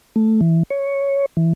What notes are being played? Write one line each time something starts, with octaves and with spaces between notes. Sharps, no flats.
A3
E3
C#5
E3